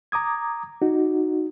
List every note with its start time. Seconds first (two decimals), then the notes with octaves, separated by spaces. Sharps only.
0.12 A#5 D6 D#6 G#6
0.82 D#4 F#4